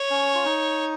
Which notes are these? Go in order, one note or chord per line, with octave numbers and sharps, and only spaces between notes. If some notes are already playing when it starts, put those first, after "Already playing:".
Already playing: C#5
C#4
F4
D#4